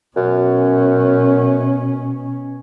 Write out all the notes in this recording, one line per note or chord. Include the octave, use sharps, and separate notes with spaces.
F#2 B2 C#4